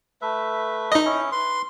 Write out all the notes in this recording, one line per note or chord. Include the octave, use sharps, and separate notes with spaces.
A3 B4 E5
D#4 D#5
C#4 E4
B4 C6